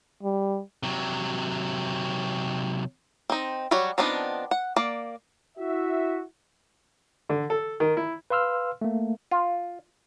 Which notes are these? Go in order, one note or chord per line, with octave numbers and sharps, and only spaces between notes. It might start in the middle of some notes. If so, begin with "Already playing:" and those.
G3
C3 F#3
C4 D#4
F#3 G3 F#4 C#5
F3 B3 C4 D4 D#4
F#5
A#3 D5
E4 F#4 E5
D3
A4
D#3
E4
B4 F5 C6 E6 F6
A3 A#3
F4